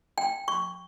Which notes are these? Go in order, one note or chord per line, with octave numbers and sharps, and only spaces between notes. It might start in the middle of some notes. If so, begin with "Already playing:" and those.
G5
C#6